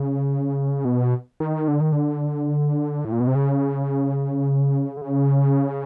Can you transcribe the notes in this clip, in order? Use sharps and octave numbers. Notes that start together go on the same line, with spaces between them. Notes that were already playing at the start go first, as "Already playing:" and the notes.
Already playing: C#3
B2
D#3
D3
D#3
D3
A2
A#2
B2
C3
C#3
D3
C#3